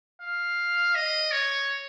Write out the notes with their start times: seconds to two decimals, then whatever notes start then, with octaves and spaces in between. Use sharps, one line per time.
0.21 F5
0.95 D#5
1.32 C#5